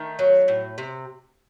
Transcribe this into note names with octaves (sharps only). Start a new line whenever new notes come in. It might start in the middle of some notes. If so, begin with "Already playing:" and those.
Already playing: D#3 A3
F#3
A2
C3